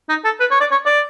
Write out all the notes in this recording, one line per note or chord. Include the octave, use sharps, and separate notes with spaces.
D#4
A4
B4
C#5
D5
C#5
D5